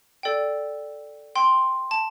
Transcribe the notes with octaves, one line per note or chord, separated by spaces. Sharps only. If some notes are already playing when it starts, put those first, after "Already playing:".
A4 D5 G5
G5 C6
A5